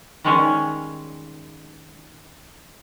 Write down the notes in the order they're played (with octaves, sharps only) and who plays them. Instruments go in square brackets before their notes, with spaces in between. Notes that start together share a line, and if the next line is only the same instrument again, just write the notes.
[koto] D#3 G3 G#3 C#4 C#5 G#5